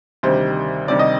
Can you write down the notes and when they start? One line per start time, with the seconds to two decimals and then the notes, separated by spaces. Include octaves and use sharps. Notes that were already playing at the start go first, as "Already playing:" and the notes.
0.23 D2 C3 D#3 G3 C5
0.88 D2 C3 D#3 G3 D5
0.99 D#5